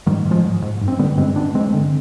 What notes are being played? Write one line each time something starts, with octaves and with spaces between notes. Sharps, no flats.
G#2 D#3 G3
G#2
F3 G#3
G#2
G#2
G2
C4
D3 G3 B3
G2 G#3 C4
G2 B3 D4
G2 G#3 C4
D3